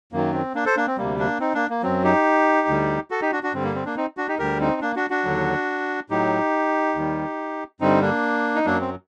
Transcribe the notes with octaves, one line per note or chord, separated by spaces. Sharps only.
F#2 D#3 F#3 A#3
C4
A#3 D4
A4 C5
A#3 D4
C4
D2 C3 G3 A#3
A#3 D4
C4 D#4
A#3 D4
A#3
F#2 F#3 C4
D#4 G4
D2 D3 G3
F#4 A4
D#4 G4
D4 F#4
D4 F#4
G2 D3 G3 C4
A#3
C4
A#3 D4
C4 D#4
D4 F#4
D#4 G4
D2 D3 G3 G4 A#4
C4 D#4
A#3 D4
D4 F#4
D4 F#4
D#2 D3 F#3
A2 F#3 D#4 G4
D#2 D#3 G3
G2 D3 G3 C4 D#4
A#3 D4
D#4
F#2 F#3 A#3 D4
C4